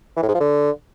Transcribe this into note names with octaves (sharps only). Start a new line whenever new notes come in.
E3
A2
G#2
F3
D3